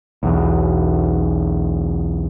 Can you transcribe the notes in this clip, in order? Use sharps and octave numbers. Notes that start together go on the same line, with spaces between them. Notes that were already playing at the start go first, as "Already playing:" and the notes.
B1 E2